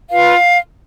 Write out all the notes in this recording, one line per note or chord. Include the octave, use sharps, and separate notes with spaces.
F4 B4 F5